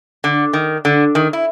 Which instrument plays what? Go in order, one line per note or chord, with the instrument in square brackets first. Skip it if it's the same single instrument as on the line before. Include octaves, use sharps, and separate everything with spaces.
[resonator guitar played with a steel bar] D3
D#3
D3
D#3
E4